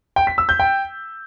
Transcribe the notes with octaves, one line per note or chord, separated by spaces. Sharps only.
G5
B6
E6
G6
G5